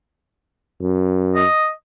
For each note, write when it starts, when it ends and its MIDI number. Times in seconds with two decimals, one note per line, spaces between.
0.82 1.45 42
1.35 1.70 75